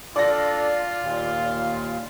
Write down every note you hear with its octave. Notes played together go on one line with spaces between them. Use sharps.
D4 F4 A4 D5 A#6
D#2 A#2